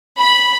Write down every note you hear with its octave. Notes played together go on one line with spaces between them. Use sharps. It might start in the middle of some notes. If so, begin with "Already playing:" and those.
B5